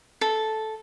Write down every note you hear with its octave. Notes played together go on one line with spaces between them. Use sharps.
A4